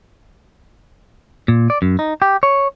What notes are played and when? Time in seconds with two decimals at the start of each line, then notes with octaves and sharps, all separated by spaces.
1.48 A#2
1.70 D5
1.82 F#2
1.99 D#4
2.22 G4
2.43 C#5